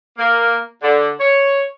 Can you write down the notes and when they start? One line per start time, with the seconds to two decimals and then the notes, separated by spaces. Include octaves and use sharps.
0.18 A#3
0.82 D3
1.20 C#5